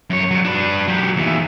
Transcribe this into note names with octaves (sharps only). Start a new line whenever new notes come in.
F#2 C#5
F#3 G3
D4 B4
F#3 G4
D#2 E3